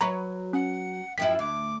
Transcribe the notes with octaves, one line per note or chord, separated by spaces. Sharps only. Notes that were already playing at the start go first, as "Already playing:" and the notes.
F#3 B4 C#5 A#5 B5 C#6
C#4 F#5
F#2 F3 E4 G5 B6
D2 D6